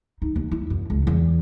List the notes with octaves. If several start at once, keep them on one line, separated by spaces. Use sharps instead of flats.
D#4
D#2
E4
F#2
C#2
E2